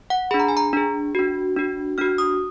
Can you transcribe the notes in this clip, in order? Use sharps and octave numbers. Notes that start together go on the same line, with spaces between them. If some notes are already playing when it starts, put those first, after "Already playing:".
F#5
D4 G#4 B5
A#5
G#5
A#5
D4 G#4
D4 F#4
D4 F#4
D4 F#4 F6
D#6